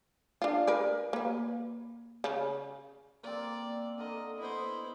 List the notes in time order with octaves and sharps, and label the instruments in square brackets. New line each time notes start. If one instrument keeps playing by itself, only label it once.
[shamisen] D4 F4
A#4 B4 D5
A#3 B4
C#3
[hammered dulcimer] A#3 C4 [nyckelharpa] D5
[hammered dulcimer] D3 A#4 D6 [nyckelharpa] D#5
[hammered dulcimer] B3 D#5 [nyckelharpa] E4 C5